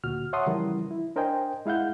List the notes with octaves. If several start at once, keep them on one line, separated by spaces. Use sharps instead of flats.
D2 A#2 F#4 F6
C#5 E5 F#5 A5 C6 D#6
C#3 E3 F3 G3 E4 A#4
E4
D4 A#4 C5 D#5 G5 G#5
G#3 E4 F5 F#5 G6